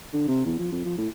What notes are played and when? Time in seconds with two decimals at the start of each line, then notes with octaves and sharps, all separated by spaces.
0.13 D3
0.28 C3
0.45 E2
0.58 F3
0.71 F2
0.85 F3
0.98 A2